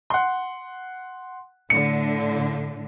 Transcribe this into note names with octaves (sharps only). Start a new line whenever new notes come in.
F#5 C6
A2 D3 C#7